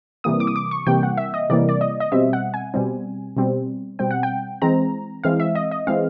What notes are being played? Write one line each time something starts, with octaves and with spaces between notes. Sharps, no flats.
C3 E3 G3 A#3 D#6
D6
D#6
D6
C#6
C3 E3 G3 A#3 G5
F#5
E5
D#5
C3 E3 G3 A#3 D5
D5
D#5
D#5
B2 G3 C4 E5
F#5
G#5
B2 G3 C4
B2 G3 C4
B2 G3 C4 G5
F#5
G5
E3 G#3 C4 A#5
E3 G#3 C4 F5
E5
D#5
D#5
E3 G#3 C4 F5